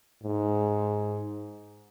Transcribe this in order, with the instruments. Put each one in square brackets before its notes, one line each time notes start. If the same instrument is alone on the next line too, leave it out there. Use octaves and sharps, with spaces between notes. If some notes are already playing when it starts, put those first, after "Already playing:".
[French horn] G#2